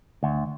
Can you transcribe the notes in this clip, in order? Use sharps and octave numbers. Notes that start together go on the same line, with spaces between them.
D2